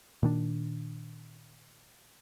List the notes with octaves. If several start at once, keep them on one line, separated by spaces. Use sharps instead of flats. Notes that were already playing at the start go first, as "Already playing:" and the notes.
A#2 D#3 D4